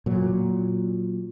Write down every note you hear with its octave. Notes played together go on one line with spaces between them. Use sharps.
A#2 F#3